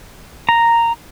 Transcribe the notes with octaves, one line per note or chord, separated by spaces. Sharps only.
A#5